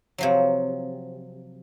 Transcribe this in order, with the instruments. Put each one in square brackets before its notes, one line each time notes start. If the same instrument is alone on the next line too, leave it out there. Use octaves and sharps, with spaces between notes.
[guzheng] C3 F3 F#3